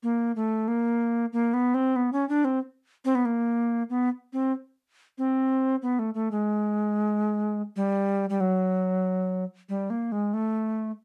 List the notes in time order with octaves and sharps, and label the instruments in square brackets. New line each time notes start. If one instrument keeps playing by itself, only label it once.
[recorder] A#3
A3
A#3
A#3
B3
C4
B3
C#4
D4
C4
C4
B3
A#3
B3
C4
C4
B3
A3
A3
G#3
G3
G3
F#3
G3
A#3
G#3
A3